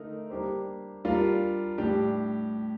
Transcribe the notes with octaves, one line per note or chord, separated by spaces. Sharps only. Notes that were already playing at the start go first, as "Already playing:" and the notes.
Already playing: D3 A3 D#4 A#4
G3 A#3 D4 G4 C5
G3 D4 F4 A#4 F5
A2 G3 D4 G4